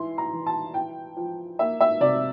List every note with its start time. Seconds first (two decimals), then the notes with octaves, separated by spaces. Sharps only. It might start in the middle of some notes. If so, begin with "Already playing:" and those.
Already playing: E3 E4 C6
0.18 A#5
0.33 E3
0.46 A5
0.74 E4 G5
1.17 F3
1.59 A#3 E5
1.80 E5
2.00 C3 D5